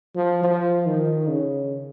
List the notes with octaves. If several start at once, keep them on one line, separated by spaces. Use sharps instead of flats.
F3
F3
D#3
C#3